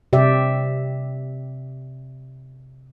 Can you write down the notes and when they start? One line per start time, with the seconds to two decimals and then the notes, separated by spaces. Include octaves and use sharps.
0.13 C3 G4 D5 E5